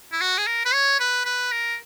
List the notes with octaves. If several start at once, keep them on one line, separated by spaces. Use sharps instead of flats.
E4
F#4
G#4
A#4
B4
C#5
B4
B4
A#4